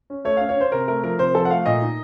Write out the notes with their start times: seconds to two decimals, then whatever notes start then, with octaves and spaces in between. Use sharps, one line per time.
0.10 C#4
0.25 A3 C#5
0.37 C#4 F5
0.49 C#5
0.57 C#4 C5
0.72 C3 A#4
0.88 A3 A#4
1.03 F3 A#4
1.19 C3 C5
1.35 F3 A4
1.45 F#5
1.50 A3 F5
1.66 A#2 D#5
1.82 D#4